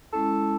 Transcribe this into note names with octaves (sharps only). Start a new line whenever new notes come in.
G#3 C#4 E4 A4